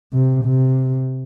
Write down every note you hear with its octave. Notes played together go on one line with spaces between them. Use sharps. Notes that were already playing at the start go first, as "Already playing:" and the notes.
C3
C3